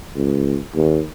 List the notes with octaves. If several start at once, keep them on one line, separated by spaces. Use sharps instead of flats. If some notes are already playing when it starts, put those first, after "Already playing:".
C#2
D#2